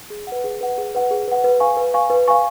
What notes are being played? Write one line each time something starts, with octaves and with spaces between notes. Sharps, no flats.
G#4
B4 F#5
G#4
B4 F#5
G#4
B4 F#5
G#4
B4 F#5
B4
F5 G#5 C#6
B4
F5 G#5 C#6
B4
F5 G#5 C#6